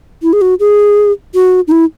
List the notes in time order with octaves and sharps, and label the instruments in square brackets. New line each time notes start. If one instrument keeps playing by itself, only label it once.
[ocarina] E4
G#4
F#4
G#4
F#4
D#4
E4